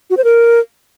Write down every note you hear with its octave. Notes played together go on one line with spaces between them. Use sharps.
F#4
C5
A#4